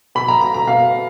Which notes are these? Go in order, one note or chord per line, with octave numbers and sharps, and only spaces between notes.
B2 B5
A#5
A#5
A#5
B2 F5